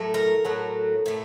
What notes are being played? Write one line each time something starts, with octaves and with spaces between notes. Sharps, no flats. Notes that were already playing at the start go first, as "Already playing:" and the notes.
Already playing: A2 F#3 A3
A#4
A2 F#3 A3
A2 A3